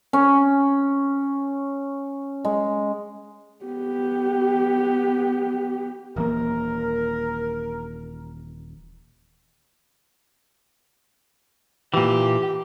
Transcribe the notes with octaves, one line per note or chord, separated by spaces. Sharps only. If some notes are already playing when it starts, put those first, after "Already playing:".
C#4
G#3
B3 G4
D#1 E3 A#3 A#4
A#2 E3 G4